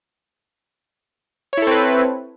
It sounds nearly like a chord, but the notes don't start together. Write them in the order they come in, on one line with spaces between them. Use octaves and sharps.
C#5 E4 A4 C4 B4